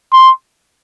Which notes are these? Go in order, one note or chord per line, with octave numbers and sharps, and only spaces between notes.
C6